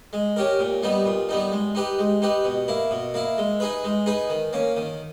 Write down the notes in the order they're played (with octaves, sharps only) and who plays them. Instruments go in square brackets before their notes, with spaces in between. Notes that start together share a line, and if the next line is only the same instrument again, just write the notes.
[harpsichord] G#3
C#4 G4 A#4
A#2
G3 B3 D#4
A#2
G3 B3 D#4
G#3
D#4 G4 B4
G#3
D#4 G4 B4
B2
A#3 E4
B2
A#3 E4
G#3
D#4 G#4 B4
G#3
D#4 G#4 B4
D#3
A#3 C#4
D#3